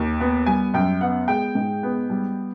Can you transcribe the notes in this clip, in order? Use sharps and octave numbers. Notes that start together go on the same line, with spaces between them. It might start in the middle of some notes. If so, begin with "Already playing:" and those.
Already playing: D#2
B3
G3 G#5
F#2 G5
B3 F#5
G#3 G5
G#2
B3
G3